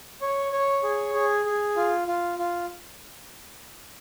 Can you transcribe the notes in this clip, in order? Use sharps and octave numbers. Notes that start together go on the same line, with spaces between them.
C#5
C#5
G#4
G#4
G#4
F4
F4
F4